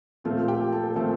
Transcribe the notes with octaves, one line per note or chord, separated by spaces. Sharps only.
A#2 F3 A3 C4 F4 F5
G4 G5
A4 A5
A#2 F3 A3 C4 A4 A5